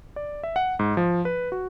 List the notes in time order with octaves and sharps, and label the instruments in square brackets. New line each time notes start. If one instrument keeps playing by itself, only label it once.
[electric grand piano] D5
E5
F#5
G#2
F3
B4
F#4